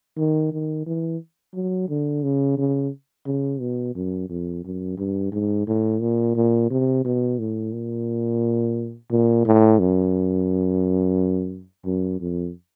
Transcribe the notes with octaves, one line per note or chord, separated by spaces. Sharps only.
D#3
D#3
E3
F#3
D3
C#3
C#3
C#3
B2
F#2
F2
F#2
G2
G#2
A2
A#2
A#2
C3
B2
A2
A#2
A#2
A2
F#2
F#2
F2